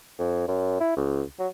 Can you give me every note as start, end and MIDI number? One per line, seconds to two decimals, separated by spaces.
0.19 0.46 41
0.48 0.77 42
0.80 0.95 64
0.97 1.22 37
1.39 1.48 54